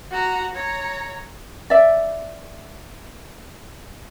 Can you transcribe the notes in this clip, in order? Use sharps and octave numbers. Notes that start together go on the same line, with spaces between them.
F#4 A#5
C#5 A#5
D5 E5